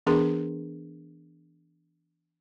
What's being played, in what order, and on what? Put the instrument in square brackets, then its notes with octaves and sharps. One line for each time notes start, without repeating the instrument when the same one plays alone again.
[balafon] E3 B3 D4 G#4 A#4 C6